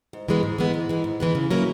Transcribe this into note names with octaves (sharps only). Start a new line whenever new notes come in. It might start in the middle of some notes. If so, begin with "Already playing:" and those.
G#2
E3 G#3 B3
G#2
E3 G#3 B3
G#2
E3 G#3 B3
G#2
E3 G#3 B3
C#3
F#3 A#3 C#4 E4